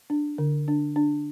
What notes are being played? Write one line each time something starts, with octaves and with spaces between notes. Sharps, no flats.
D4
D3
D4
D4